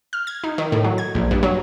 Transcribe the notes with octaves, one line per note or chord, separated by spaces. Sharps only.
F6
G#6
D#4
D#3
A2
F#3
G#6
A#1
G2
F#3